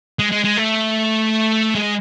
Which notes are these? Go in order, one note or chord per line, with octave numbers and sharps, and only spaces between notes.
G#3
G#3
G#3
A3
G#3